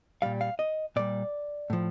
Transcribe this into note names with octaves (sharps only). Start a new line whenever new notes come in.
A#2 G3 F5
F5
D#5
A#2 G3 D5
A2 F3